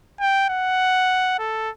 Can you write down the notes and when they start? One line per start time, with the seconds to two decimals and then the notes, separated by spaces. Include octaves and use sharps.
0.20 G5
0.49 F#5
1.39 A4